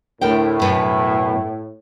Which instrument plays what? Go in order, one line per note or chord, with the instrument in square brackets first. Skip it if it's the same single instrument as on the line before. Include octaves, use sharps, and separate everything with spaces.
[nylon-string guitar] D2 A#4 G5 [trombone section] A2
[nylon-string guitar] F#2 B2 B4